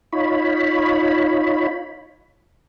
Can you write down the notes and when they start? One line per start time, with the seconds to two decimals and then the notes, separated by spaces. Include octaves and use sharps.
0.12 D#4 F4 C#5 B5